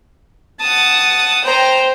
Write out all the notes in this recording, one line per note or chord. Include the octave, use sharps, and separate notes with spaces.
F#5 A5 D#6
C5 G5 A#5